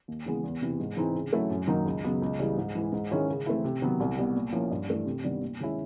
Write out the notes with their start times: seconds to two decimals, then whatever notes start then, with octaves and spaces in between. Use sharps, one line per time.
0.08 D#2
0.26 C#3 E3 G#3 B3
0.43 E2
0.62 C3 E3
0.80 G#2
0.97 E3 G#3 C4 D#4
1.15 C#3
1.33 F#3 A3 C#4 E4
1.50 F#2
1.68 D#3 F#3 A#3 D#4
1.86 C#2
2.04 C#3 F#3 B3
2.22 C#2
2.39 C#3 E3 G3
2.57 G#2
2.75 E3 G#3
2.93 G#2
3.11 D#3 G#3 C#4 E4
3.29 C#3
3.46 E3 A3 C4 E4
3.64 C3
3.82 D#3 F#3 B3
4.00 C2
4.17 B2 G3 B3
4.36 A#2
4.52 F3 A#3 C#4 E4
4.71 G2
4.89 E3 A3 D4
5.06 C3
5.24 D#3 G3 B3 D4
5.41 D#2
5.60 D#3 G#3 C#4 E4